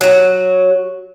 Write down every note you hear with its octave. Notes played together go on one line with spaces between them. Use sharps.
F#3 F#4